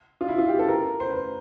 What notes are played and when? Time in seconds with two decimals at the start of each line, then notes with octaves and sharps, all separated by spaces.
0.21 F4
0.28 E4
0.38 F4
0.48 G4
0.59 A4
0.68 A#4
1.00 C5
1.09 B4